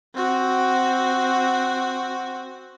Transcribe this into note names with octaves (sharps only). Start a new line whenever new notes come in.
C4 F#4